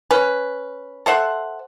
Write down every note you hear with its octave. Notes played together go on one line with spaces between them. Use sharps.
C#4 B4
A4 C5 E5 F#5